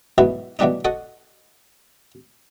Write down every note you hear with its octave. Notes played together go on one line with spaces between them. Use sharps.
G#2 B2 E3 F#3 E4
B2 E3 F#3 G3 D4 D#4
F#4 A4 D#5 F#5